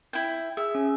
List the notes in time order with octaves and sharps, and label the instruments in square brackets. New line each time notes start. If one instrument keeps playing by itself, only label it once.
[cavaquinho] E4 G5
[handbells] G#4 [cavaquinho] E5
[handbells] C#4